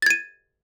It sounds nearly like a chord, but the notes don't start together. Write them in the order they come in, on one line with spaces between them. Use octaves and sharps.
A6 G#6 D#7